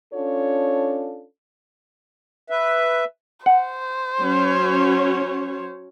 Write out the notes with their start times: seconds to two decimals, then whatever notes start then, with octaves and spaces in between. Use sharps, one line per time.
0.13 C#4 D4 F4 A4 C#5
2.50 B4 E5
3.46 C5 F#5
4.19 F#3 C#4 C#5